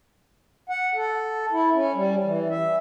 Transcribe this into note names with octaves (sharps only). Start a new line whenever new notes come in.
F#5
A4
E4
C#4
G3
E3
E5